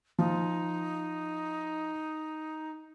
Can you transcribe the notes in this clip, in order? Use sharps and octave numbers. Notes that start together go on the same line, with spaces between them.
F3 D#4